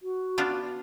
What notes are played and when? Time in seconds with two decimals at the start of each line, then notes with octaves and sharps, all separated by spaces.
0.02 F#4
0.38 B3 D4 F4